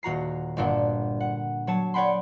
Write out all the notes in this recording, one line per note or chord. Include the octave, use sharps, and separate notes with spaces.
D#1 F#4 A#5 C7
G1 G2 A#2 D4 F#5
F#5
F#3 C#5 A5
C#5 D5 F#5 G5 B5 C6